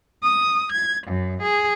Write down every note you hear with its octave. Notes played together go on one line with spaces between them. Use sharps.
D#6
G#6
F#2
G#4